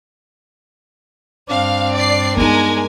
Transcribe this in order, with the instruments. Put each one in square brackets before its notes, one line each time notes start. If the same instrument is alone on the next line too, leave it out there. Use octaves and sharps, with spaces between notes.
[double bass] G2 D4 [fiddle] C4 [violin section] F5
[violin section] D5 C7
[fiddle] G#3 [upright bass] B3 D#4 [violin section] A#4 G#5